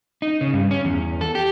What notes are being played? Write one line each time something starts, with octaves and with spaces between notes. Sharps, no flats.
D#4
C#3
G2
C#4
E2
A4
G4